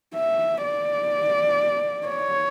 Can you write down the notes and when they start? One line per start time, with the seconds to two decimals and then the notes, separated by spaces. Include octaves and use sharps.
0.15 E5
0.63 D5
2.07 C#5